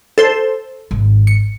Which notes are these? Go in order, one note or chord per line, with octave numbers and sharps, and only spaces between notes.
A4 C5
G#1
C#7